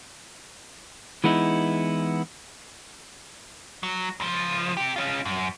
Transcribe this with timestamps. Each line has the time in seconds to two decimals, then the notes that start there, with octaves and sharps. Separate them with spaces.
1.24 E3 G#3 B3 D#4 E4
3.83 F#3
4.20 C#2 F3
4.77 C3 G4
4.96 C#4 F4
5.25 F#2